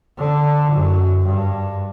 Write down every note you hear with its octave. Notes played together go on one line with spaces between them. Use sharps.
D3
F#2
G2